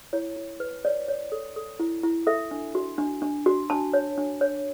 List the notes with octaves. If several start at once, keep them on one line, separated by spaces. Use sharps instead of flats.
E4 C#5
E4
B4
C#5 D5
C#5
A4
A4
E4
E4
A4 E5
D4
F#4
D4
D4
F#4
D4 A5
C#5
D4
C#5